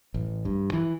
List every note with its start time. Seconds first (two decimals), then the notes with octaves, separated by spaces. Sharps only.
0.14 A1
0.45 G2
0.73 E3